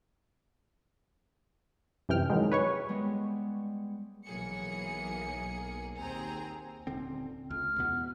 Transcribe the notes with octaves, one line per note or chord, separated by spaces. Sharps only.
F#2 C3 E3 G5 F6
D#3 E3 F#3 G#3
B4 C#5 C#6
G3 G#3 B3
B1 E3 F#3 A#3 G#4 C#7
D#2 C4 G#4 A#5
D#1 D3 C4
C#2 F6
E2 B2 B3